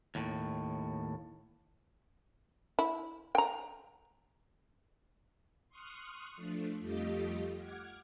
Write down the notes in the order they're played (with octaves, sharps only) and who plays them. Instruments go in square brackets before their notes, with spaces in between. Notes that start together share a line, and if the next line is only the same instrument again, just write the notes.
[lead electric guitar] D#2 A2
[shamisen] E4
G5 A#5
[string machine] C6 C#6 D#6 F6 F#6
F3 A3 D4
F2 G3 A3 F4 G4 D#5
F#5 D6 F6 G#6